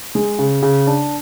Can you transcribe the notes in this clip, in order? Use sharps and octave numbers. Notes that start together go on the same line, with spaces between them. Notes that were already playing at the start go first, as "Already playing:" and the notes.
G#3
C#3
C#3
D4